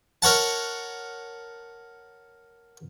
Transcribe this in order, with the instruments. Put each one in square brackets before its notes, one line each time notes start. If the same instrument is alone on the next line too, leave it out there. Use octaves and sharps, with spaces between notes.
[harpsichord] A#4 C#5 F#5 A5